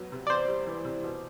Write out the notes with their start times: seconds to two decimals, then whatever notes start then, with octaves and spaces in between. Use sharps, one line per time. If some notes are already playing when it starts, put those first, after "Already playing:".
Already playing: E2 F#3 B3
0.12 C3
0.27 D5
0.30 E2 C5
0.48 G3
0.67 E3
0.85 C3
1.03 B2